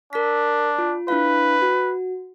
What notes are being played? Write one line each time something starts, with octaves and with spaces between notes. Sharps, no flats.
D4 A#4 B6
F4
D4 E4 B4 F5
F#4